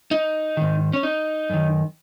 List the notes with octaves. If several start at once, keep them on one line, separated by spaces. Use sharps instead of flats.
D#4
G#2 D#3
C#4
D#4
F#2 D#3